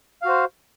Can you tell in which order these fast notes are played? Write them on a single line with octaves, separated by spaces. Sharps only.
F5 F#4 C5